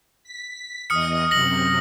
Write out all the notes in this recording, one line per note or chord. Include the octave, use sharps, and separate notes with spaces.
B6
E2 D#5 D#6 F6 C#7
F#2 C3 A#6 F#7